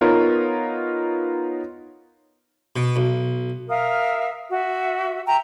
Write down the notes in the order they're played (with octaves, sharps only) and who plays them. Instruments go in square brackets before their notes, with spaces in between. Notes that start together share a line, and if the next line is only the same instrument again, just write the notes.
[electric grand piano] B3 D#4 F4 A#4 B4 C#5
[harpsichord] B2
B1
[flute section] A#4 E5 F5 D#6
F#4 E5
E5 G5 A#5